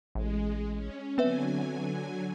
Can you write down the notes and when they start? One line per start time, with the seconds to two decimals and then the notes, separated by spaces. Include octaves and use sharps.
0.15 A1 G#3
0.74 C#4
1.18 D3 F#3 B3 C4 B4 E5 G#5